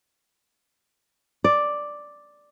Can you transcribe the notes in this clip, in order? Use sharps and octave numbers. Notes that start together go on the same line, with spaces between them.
D5